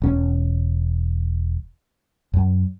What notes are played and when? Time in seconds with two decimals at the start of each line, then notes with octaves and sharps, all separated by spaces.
0.02 E1 C#4
2.34 F#2